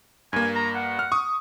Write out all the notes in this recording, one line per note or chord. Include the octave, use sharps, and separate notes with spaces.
G2 A#3 G#5
A#5
F#5
F6
C#6 D#6